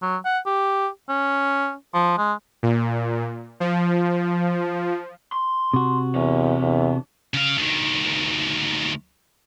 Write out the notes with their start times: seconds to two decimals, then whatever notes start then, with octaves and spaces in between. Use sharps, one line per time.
0.02 F#3
0.25 F#5
0.46 G4
1.09 C#4
1.94 F3
2.18 G#3
2.63 A#2
3.60 F3
5.32 C6
5.74 C3 F#4
6.15 E2 D4 C#5
6.61 E2
7.34 C#3 F5
7.58 D2 D#3